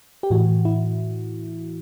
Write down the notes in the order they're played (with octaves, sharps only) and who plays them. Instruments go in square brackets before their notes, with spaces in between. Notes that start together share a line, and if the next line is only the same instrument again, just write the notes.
[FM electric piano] G4
A2 E3 F#4
E4